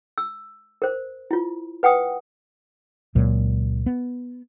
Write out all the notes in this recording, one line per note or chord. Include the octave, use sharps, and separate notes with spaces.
E6
A#4 C5
E4 F4
B4 F#5 G5 D#6
C#2 A#2 F#3
B3